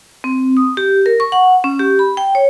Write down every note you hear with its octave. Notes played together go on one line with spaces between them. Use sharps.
C4
D#6
G4
A#4
C#6
F#5
C#4
G4
B5
G5
C#5